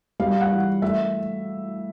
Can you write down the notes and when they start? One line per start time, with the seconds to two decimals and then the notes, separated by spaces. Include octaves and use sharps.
0.20 G3 F5
0.41 F#5
0.51 E3
0.82 A3 E5